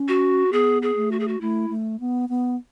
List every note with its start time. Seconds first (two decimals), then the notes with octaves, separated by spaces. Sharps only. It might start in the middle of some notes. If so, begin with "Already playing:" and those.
Already playing: C#4
0.08 F#4
0.52 B3 G#4
0.82 G#4
0.96 A3
1.11 F#4
1.20 G#4
1.28 F#4
1.41 A3 E4
1.70 A3
2.00 B3
2.29 B3